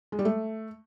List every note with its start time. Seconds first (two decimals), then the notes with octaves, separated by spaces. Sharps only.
0.12 G#3
0.19 G3
0.25 A3